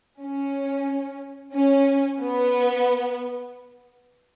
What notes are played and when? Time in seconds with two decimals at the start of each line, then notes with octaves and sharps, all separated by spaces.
0.21 C#4
1.54 C#4
2.20 B3